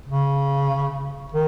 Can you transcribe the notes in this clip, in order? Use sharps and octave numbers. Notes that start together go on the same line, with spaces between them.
C#3
D#3